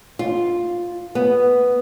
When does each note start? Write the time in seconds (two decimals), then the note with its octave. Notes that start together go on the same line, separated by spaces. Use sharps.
0.19 F4
1.15 B3